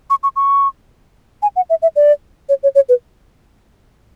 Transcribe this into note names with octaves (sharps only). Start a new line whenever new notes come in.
C#6
C#6
C#6
G#5
F#5
E5
E5
D5
C#5
C#5
C#5
B4